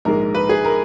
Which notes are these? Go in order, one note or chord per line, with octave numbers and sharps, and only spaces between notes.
A#1 G#2 D#3 G#3 A#4
B4
G#4
A#4